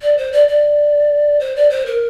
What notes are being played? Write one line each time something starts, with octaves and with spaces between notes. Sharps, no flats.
D5
C5
D5
D5
C5
D5
C5
A#4